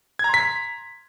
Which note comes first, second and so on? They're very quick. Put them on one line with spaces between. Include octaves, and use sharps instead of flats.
G#6 A#5 C6 B6